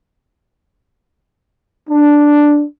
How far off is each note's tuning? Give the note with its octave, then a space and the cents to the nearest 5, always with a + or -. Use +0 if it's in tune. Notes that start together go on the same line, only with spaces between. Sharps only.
D4 +0